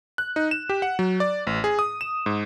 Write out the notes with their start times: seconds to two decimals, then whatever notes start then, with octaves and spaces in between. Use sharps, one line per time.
0.18 F#6
0.36 D#4
0.51 E7
0.69 G4
0.82 F#5
0.99 F#3
1.20 D5
1.47 A1
1.64 G#4
1.79 D#6
2.01 E7
2.26 G#2